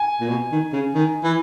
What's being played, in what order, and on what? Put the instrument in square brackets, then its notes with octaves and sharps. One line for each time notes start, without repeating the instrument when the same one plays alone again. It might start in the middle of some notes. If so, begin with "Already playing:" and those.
Already playing: [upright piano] G#5
[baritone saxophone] A#2
B2
D#3
C#3
D#3
E3